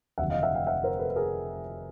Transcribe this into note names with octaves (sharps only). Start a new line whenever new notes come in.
F1 D#2 D3 F#3 E5 F#5
D#5 F5
E5 F#5
F5 G5
E5 F#5
A#4 C5
A4 B4
B4
G#4 A#4